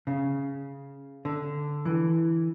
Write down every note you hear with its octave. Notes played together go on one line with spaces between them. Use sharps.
C#3
D3
E3